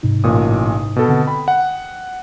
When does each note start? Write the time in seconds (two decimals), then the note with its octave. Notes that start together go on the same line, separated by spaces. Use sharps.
0.03 G#2 C3 D#4
0.24 A1 A#2 D#6
0.96 B2 A4
1.08 D3 C4 F#5
1.27 G5 B5
1.48 F#5